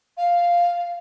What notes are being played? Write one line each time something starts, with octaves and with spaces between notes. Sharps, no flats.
F5